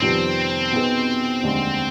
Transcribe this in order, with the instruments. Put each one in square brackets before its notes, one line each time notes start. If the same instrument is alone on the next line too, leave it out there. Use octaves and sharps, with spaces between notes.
[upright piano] F2 C3 D#3 G3 B3 [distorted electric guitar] C4
[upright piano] B2 B3 D#4 G#4
F1 D#2 D3 G#3